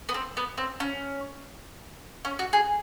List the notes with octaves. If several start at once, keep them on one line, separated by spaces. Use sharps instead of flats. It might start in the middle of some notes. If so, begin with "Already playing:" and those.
B3
C4
B3
C4
C#4
C#4
F#4
G#4